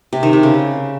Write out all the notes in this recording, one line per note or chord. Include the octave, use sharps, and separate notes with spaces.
C3
D#3
C3
C#3